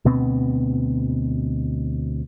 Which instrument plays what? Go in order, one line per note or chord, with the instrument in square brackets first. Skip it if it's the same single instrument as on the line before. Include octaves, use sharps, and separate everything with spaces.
[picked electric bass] D2 B2 B3 C4